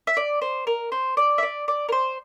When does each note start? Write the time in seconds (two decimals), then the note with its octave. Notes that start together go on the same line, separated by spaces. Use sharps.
0.07 E5
0.17 D5
0.41 C5
0.67 A#4
0.92 C5
1.17 D5
1.38 E5
1.43 D5
1.68 D5
1.89 A#4
1.92 C5